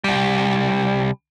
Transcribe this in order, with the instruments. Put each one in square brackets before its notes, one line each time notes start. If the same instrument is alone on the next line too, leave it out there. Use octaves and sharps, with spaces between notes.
[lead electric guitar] C2 G3